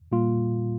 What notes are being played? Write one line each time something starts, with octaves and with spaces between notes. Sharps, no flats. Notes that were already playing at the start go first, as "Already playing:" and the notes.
A#2 G3 A#3 F4